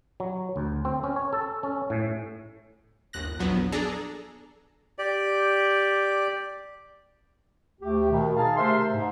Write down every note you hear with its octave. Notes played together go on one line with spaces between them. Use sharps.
F#3
D2
C4
C#4
C#5
A4
C#4
A2
G1 D#2 F#6 A#6
A#1 E2 F3 F#3 B3
D4 G#4 A4 A#5
G4 D5
D2 A3 G4
B2 D#3
D#4 G#4 F5 A5
C3 A3 A#4 C5 E5 C6
G#2